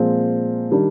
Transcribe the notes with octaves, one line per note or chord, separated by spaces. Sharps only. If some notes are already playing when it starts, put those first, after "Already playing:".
Already playing: A#2 F3 G#3 C4
D#3 G3 D4